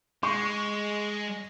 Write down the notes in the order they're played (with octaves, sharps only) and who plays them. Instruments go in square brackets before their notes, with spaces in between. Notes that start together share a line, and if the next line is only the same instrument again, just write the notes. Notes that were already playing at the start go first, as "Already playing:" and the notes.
[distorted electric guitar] G#3 [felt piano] C#6